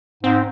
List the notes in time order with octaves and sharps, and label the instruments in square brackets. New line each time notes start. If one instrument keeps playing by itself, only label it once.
[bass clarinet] G#2 [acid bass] C4